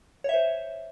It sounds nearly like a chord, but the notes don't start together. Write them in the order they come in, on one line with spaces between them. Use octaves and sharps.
C#5 E5 C5